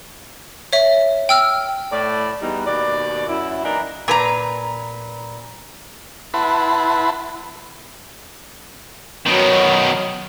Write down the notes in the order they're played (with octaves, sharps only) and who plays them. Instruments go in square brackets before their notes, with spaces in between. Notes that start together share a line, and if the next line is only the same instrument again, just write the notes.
[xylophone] C#5 E5
G5 E6 F6
[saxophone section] A2 D5
E2 E3 G3 D#4
D#2 B2 D5
F#2 E4
E3 A#3 D4 D#4
[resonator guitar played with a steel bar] A#2 B4 A#5
[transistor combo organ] E4 B4 F#5 A5 B5 C6
[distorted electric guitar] B2 D#3 [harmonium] F#3